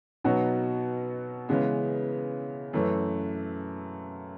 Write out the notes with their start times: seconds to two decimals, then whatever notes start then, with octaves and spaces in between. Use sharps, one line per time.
0.24 B2 F#3 B3 D#4 F#4
1.49 C#3 E3 G#3 B3
2.73 F#2 E3 A3